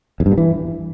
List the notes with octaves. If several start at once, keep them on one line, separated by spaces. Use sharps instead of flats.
E2
G2
A#2
E3